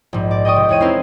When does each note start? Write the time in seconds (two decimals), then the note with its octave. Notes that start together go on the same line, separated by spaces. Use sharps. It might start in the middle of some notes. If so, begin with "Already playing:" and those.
0.13 A#1 G#2
0.31 D5
0.45 D#5 G5 C#6 D#6
0.56 C3
0.69 E2 C#5 D#7
0.81 C4 C#4 D#4 E4 A#4 C5